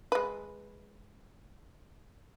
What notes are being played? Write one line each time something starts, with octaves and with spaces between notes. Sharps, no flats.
G#3 B4